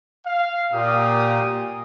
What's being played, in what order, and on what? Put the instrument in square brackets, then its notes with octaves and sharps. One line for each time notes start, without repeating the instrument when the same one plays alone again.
[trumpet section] F5
[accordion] A#2 [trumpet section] A#3 G4 D#6